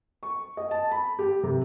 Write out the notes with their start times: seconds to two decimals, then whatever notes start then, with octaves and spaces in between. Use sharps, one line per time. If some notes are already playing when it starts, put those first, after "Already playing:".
0.23 C#6
0.57 D#5
0.71 A5
0.91 B5
1.19 G4
1.43 C3